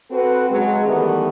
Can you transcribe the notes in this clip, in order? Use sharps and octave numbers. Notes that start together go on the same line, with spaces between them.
C4 F#4 A4 B4
C#3 F#3 G#3
D#3 E3 G3 A3 B3